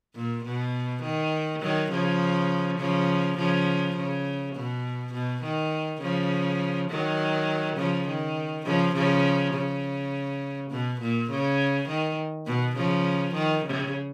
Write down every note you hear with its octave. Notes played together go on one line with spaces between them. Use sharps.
A#2
B2
D#3
D#3 F#3
C#3 F3
C#3 F3
C#3 F3
C#3
B2
B2
D#3
C#3 F3
D#3 F#3
C#3 F3
D#3
C#3 F3
C#3 F3
C#3
B2
A#2
C#3
D#3
B2
C#3 F3
D#3
C#3